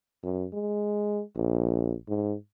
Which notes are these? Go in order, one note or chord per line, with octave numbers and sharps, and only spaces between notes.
F#2
G#3
A#1
G#2